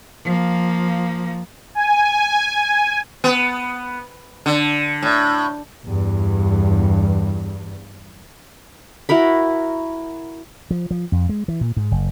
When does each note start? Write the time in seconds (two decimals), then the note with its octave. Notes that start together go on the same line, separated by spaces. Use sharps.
0.24 F3 A#3
1.75 G#5
3.24 B3
4.46 D3
5.02 A2
5.86 E2 G2
9.09 E4 F#4 A#4 B5
10.71 F3
10.91 F3
11.12 F2
11.29 G#3
11.48 E3
11.61 A#2
11.77 G#2
11.92 F#1